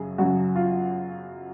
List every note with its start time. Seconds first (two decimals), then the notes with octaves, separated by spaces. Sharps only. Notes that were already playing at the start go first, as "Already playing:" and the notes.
Already playing: F#2 C#3 F#3 G#4
0.18 F#2 C#3 F#3 F#4
0.56 F4